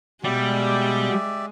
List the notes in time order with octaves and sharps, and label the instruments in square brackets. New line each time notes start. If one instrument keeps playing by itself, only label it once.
[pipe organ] B2 B3 [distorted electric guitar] G3 [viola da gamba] G#3 [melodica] G4 D5 E5